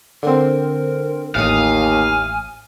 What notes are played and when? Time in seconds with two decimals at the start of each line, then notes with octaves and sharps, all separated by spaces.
0.23 D3 C4 A#4
1.35 A1 D#2 F5 G#5 D#6